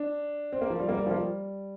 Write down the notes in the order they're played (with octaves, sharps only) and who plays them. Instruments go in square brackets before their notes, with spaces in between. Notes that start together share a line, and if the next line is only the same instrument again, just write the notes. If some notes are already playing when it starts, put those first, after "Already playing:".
Already playing: [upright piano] D4
C4
A#3
F3
G3
A#3
G3
F3
A#3
G3